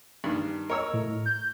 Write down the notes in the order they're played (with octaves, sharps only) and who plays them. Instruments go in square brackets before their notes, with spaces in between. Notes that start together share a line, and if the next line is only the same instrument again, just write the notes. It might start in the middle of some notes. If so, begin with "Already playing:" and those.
[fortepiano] G2 D#3
[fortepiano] A#4 C#5 E6 [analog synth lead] D#5
[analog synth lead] A2
G6